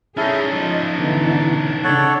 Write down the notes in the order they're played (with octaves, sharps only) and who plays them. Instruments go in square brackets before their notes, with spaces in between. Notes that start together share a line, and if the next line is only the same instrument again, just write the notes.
[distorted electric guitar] C#4 D#4 [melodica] E4 A4 [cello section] G#4
[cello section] F3 D#5 [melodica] A5
[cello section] B2 D3 E3
[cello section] C#3 D4 [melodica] A4 C#5 F#5